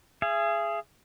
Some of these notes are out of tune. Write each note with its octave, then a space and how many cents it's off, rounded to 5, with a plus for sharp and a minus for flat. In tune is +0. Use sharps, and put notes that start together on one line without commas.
G#4 +0 E5 +45